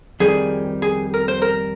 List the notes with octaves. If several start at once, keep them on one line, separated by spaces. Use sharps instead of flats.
F2 D#3 G3 G#4
G#4
A#4
C5
A#4